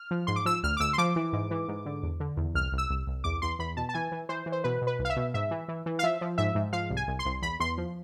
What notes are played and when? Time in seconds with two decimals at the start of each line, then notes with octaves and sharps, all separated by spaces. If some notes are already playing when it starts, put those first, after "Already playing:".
Already playing: F6
0.11 F3
0.27 G#2 C6
0.36 D6
0.45 F3 E6
0.63 D2 F6
0.77 D6
0.80 D2 E6
0.93 C6
0.98 F3 D6
1.16 E3
1.33 G#2
1.51 E3
1.68 G#2
1.86 D3
2.03 E2
2.20 D3
2.37 E2
2.54 C2 F6
2.72 C2
2.78 E6
2.90 C2
3.07 C2
3.24 E2 D6
3.42 E2 C6
3.59 E2 B5
3.77 B2 A5
3.89 A5
3.94 E3 G#5
4.12 E3
4.29 E3 C5
4.46 E3
4.52 C5
4.64 B2 B4
4.82 B2
4.87 B4
4.99 C2
5.05 F5
5.10 E5
5.16 B2
5.34 G#2 E5
5.51 E3
5.68 E3
5.86 E3
5.99 F5
6.03 F3 E5
6.21 F3
6.38 G#2 E5
6.55 G#2
6.73 F3 F5
6.90 C2
6.97 G#5
7.08 C2
7.19 C6
7.25 C2
7.42 E2 B5
7.60 E2 C6
7.78 F3